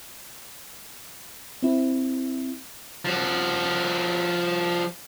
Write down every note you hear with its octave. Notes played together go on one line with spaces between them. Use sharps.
C4 E4
F3 F#4